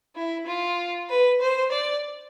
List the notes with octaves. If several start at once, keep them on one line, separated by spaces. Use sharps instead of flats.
E4
F4
B4
C5
D5